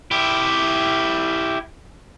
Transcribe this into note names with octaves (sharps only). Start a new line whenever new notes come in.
E4 G4